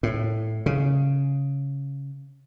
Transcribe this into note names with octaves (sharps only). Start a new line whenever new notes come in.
A2
C#3